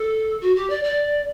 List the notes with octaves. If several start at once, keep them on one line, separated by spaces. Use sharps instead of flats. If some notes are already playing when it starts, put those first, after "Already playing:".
Already playing: A4
F#4
G4
D5
D5